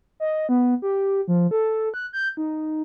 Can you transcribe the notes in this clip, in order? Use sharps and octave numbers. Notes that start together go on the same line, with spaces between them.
D#5
B3
G4
F3
A4
F#6
G6
D#4